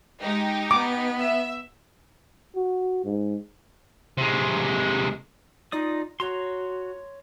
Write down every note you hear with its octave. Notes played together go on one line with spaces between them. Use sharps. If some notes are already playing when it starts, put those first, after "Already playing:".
G#3 D#4 G4
B3 D6
E5
F#4
G#2
C3 G#3
D#4 F4 D5 D#6
F#4 C#5 A#5 C6